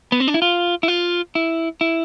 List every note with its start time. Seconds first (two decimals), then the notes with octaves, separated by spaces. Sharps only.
0.12 B3
0.20 C4
0.28 D4
0.34 E4
0.42 F4
0.83 E4
0.88 F4
1.35 E4
1.81 E4